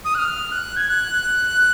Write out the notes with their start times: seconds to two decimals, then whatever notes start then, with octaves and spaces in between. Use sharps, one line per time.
0.05 D#6
0.15 F#6
0.18 F6
0.52 F#6
0.76 G#6
0.89 F#6